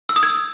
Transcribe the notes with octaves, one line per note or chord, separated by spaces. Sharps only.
E6
D#6
G#6